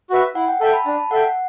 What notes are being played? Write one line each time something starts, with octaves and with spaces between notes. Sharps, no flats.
F#4 B4 E5
E4 F#5
G5
A4 E5 G5 A5
B5
D4 A5
A4 E5 F#5 G5